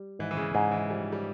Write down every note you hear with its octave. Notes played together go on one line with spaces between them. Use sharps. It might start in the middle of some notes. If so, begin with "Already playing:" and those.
Already playing: G3
G#2 E3
E3
C#3
G#2 C#3
E3
F3 G3
G3